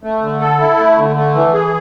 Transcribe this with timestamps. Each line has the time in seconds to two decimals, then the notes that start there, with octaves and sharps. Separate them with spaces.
0.03 A3
0.21 D3
0.41 A4
0.59 E4
0.78 A3
0.97 D3
1.16 A3
1.35 E3
1.53 G#4